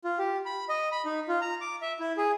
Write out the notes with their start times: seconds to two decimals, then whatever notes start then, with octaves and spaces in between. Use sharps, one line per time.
0.04 F4
0.18 G4
0.46 B5
0.69 D#5
0.92 B5
1.05 D#4
1.28 F4
1.41 A#5
1.61 D6
1.82 E5
2.00 E4
2.17 G#4